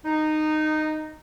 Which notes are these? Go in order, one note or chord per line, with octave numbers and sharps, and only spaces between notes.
D#4